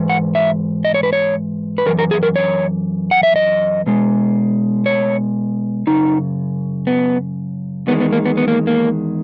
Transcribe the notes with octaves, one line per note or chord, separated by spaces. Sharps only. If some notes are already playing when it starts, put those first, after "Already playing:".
Already playing: G#2 E3
F#5
E5
D#5
C#5
B4
C#5
B4
F#2 E3 A#4
A#4
G#4
A#4
C#5
F#5
E5
D#5
B2 G#3
C#5
F#2 C#3 D#4
B3
E2 D#3 G#3 B3
B3
A#3
B3
B3
A#3
A#3